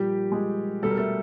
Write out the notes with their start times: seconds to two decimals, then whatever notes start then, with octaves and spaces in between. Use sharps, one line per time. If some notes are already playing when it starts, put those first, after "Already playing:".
Already playing: A#2 F3 G3 G4
0.32 G#3 G#4
0.82 B2 G3 A4
0.91 A#4
0.98 A3 A4